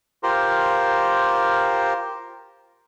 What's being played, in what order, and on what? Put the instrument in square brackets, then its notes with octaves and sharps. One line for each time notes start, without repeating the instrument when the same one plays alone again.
[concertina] F4 G4 A#4 C5